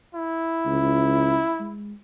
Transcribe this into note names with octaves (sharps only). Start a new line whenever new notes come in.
E4
C#2
G#3